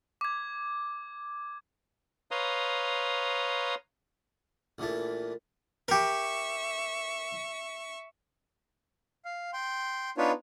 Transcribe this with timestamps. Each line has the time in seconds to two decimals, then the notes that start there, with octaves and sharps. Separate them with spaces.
0.21 D6 G#6
2.31 B4 C#5 F5 A#5 C6 D#6
4.78 A#1 A#2 E3 A3
5.88 G4 A#4 E5 C#6
9.25 F5
9.53 G5 C6
10.18 B3 D4 D#4 F4 B4 C#5